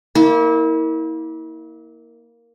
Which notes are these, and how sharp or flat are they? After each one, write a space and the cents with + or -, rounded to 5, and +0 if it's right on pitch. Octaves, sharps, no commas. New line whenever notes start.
A#3 +0 E4 -35